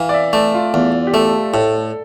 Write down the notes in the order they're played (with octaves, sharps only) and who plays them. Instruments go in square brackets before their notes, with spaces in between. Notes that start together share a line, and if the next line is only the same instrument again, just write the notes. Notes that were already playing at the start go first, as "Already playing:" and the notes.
Already playing: [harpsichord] E3 [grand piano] F5
[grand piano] D5
E5
[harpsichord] A3 [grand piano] D5
[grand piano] F4
[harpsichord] E2
[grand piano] G4
[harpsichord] A3 [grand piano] A4
[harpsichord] A2 [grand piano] A4